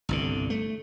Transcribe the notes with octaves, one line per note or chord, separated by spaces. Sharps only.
G1 C2 D3
A3